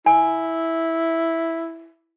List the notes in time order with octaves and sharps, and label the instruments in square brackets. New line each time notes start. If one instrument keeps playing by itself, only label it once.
[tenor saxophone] E4 [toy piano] G#5